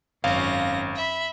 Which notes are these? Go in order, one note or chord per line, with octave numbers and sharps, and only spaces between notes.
G#1 F#2 C#4 F5 A#6
E5 B5